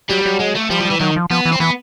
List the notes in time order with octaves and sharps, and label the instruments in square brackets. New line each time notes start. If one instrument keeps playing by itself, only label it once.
[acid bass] F#3 [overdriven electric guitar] G3
[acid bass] F#3
[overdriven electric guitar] G#3
A3
[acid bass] F3 [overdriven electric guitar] G3
[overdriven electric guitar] F3
[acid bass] G3
[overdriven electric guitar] E3
[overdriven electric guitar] D#3 [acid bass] F#3
[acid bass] F3
[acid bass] F3 [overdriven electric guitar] B3
[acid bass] E3
[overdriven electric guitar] C4
[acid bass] E3 [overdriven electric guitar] B3